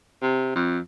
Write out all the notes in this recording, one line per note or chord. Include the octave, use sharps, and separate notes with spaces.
C3
F2